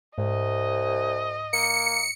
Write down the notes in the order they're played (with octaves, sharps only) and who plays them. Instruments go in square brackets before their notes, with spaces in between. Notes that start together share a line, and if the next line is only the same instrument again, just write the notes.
[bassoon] C2 [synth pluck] G#2 [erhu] D#5
[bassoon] A#3 [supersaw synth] C#7